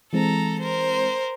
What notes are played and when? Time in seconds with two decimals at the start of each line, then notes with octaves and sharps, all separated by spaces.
0.13 E3 G#3 C4 A4 A#5
0.60 A#4 C5